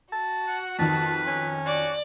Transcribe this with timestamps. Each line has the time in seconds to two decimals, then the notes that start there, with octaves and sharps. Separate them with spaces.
0.12 F#4 A5
0.47 F#5
0.79 F2 D#3 B4 A5
1.27 C#4
1.66 F#4 D5